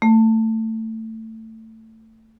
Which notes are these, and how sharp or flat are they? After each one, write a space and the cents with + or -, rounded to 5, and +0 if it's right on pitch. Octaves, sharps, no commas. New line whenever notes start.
A3 +20